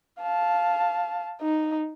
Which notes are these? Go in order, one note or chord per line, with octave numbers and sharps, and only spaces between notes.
F5 A5
D#4